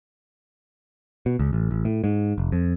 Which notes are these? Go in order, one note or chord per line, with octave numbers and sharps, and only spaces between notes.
B2
C#2
A1
A1
A2
G#2
F1
F2